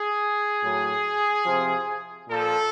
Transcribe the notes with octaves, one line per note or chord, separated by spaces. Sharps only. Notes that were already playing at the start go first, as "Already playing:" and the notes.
Already playing: G#4
A2 F#3
C3 F3
A#2 F3 A4